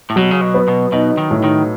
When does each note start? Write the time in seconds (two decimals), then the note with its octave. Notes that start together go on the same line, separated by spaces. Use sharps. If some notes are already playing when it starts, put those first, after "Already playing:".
0.10 A2
0.16 B2 F#3
0.31 C#3
0.41 B2
0.54 B3
0.68 B2
0.92 B2 D#4
1.17 D#3
1.31 A2
1.44 D#3